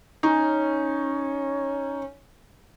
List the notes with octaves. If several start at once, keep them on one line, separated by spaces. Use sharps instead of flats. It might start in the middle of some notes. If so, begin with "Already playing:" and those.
C#4 D#4